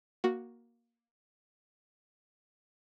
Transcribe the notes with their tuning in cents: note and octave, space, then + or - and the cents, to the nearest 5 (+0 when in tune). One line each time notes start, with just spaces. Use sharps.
A#3 +10 F#4 +0